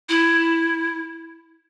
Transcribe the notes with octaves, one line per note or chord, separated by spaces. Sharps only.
E4